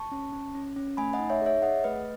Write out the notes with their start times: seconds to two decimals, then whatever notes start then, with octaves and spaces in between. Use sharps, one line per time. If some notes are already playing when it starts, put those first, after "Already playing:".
Already playing: A5 C#6
0.12 C#4
0.33 C#4
0.55 C#4
0.76 C#4
0.97 A3 G#5 B5
1.13 D#5 F#5
1.19 D#4
1.30 C#5 E5
1.41 G#4 C#5 E5
1.62 G#4 D#5 F#5
1.84 A3 B4 D#5